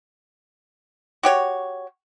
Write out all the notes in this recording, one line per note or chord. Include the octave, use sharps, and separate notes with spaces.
F#4 G4 C#5